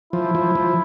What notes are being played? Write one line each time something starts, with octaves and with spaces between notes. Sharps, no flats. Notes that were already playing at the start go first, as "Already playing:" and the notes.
F3 E4
F3
F3